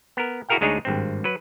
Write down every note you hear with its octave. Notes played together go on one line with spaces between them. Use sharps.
B3 A#4
E4 F#4 G#4 A#4 F5 G5
D2 G#3 D4 D#4 G#4 C#5
G#1 G2 C4
F#3 B4